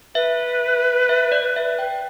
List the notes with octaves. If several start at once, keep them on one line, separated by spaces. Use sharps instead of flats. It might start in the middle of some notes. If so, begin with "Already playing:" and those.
B4 E5
E5
D5
E5
G5